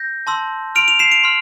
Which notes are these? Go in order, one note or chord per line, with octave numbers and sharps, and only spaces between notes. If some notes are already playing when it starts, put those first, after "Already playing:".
Already playing: G6 A#6
A5 C6 E6
C6 F6 D7 F7
D7 F7
C7 E7
D7 F7
C6 F6